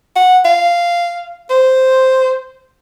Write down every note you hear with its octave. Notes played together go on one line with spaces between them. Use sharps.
F#5
F5
C5